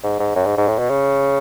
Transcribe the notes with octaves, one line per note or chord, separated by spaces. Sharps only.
G#2
G#2
F#2
G#2
G#2
A2
B2
C#3